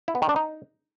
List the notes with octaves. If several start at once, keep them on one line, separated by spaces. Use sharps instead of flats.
E4
B3
D#3
D4
D#4